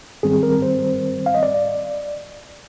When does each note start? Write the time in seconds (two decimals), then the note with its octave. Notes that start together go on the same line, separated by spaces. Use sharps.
0.23 G#2 D#3 G3 C4 G#4
0.43 A#4
0.62 C5
1.26 F5
1.34 D#5
1.43 D5